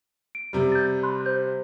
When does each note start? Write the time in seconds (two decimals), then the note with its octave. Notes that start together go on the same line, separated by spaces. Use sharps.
0.35 D7
0.53 C3 G3
0.72 G6 A6
1.03 B5 C6 F#6
1.26 C5 G6